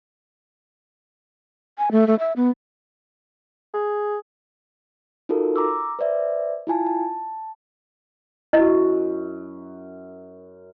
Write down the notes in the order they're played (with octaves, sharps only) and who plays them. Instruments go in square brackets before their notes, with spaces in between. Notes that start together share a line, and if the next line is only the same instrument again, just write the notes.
[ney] G#5
A3
A3
E5
B3
[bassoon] G#4
[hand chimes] D#4 F4 F#4 A4 A#4
A#5 D6 E6
B4 C5 D5 E5
E4 F4 G#5 A5
A5
[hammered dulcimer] F#2 [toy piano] E4 D#5